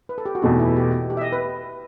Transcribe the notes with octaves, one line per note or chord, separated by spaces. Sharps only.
B4
A4
G4
F#4
E2 B2 A3 D#4
E4
G4
G4
E5
D#5
B4